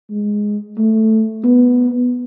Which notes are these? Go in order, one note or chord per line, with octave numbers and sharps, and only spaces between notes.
G#3
A3
B3